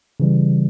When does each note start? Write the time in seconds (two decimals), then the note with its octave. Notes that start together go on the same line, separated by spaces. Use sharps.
0.20 C#3 E3 G3